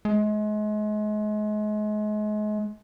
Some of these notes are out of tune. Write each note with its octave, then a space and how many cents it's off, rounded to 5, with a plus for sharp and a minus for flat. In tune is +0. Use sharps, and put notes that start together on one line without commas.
G#3 +35